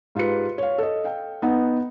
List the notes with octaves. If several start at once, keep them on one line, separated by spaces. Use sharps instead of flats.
G#2 F4 G4 B4 C#7
C#5 F5
A4 D#5
F5 G5
B3 D#4 F#5